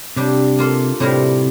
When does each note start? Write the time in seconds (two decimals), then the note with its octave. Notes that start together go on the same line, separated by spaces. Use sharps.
0.16 C3 G3 D4 G4
0.59 A#3 F4 A4
1.00 A2 C3 G3 C4 E4 A#4